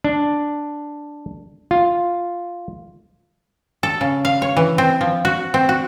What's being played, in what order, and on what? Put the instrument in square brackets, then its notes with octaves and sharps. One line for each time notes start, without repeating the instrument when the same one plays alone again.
[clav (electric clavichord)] D4
F4
[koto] A4
C#3
F5
C#5
E3
C4
F3
F#4
C4
F#4